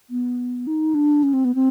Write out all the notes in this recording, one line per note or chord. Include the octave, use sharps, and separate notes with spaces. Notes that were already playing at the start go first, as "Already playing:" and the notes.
B3
D#4
D4
C#4
C4
B3
C4